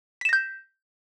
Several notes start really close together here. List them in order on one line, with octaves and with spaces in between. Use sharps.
B6 E7 A#6 G6